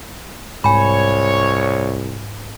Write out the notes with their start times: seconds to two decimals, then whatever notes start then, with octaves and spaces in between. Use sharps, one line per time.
0.64 C2 G#2 C#5 G#5 B5